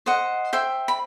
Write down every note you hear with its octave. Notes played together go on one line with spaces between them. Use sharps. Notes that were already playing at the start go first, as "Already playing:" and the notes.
C5 D#5 F#5
C5 E5 G5
B5